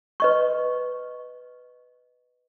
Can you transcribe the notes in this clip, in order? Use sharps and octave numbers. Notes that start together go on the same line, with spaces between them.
B4 D#5 C#6